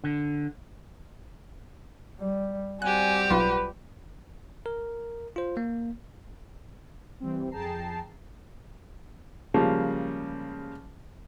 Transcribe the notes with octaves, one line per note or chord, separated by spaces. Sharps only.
D3
G3
G3 C4 F#4 G4 G#5 F#6
B1 F4 B4
A#4
F4 C5
A#3
E3 G3 C4
F2 G#4 G5 A5 A#5 C7
C#3 F3 G3 G#3 A#3